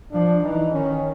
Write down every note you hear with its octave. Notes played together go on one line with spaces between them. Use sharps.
F3 D4
E3 D#4
D#3 C#4